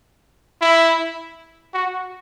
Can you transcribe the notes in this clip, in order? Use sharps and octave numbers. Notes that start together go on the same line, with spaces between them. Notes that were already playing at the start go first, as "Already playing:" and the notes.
E4
F#4